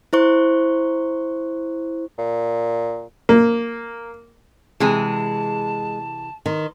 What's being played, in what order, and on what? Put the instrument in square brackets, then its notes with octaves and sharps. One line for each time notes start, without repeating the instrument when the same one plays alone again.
[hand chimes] E4 C5 C#6
[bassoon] A#2
[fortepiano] A#3
[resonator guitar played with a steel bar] C3 E3 G#4 [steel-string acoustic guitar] G#3 [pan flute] A5
[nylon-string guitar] D#3 [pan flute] C6